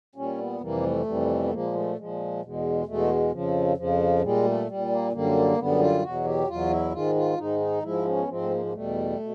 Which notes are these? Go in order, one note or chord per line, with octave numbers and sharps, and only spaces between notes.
A#2 G3 C#4
B3
F2 C3 E3 G3 A#3
A3
F2 C3 E3 G3
B3
A#2 F3 G#3 A#3
A3
A#2 F3 G#3
E2 B2 G#3
E2 B2 G#3 A3
F2 C#3 F3
F2 C#3 F3
A#2 G3 G#3
A3
A#2 G3
A#3
F#2 D3 G3 A#3
F#2 D3 G3 B3
F4
E2 B2 F#3 F#4
G4
E2 B2 F#3 F4
E4
G#2 D#3 G#3 F4
F4
G#2 D#3 G#3 D#4
D#4
G#2 F3 G#3 E4
C#4
B3
G#2 F3 G#3 C4
A3
A#3
A#3
E2 B2 G3 A3
B2